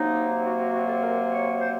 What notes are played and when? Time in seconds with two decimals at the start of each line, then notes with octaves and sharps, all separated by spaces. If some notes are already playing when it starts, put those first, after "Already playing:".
Already playing: C3 F#3 A#3 D#4
0.45 F#4
0.59 F#4
0.73 F#4
0.88 A4
1.02 A#4
1.31 C#5
1.60 C5